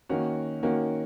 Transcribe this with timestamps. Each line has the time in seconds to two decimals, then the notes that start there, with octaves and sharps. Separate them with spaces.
0.09 D#3 A#3 C#4 F#4
0.62 D#3 A#3 C#4 F#4